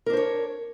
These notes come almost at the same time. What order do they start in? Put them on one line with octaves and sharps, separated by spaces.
A#4 D4 C5 C#5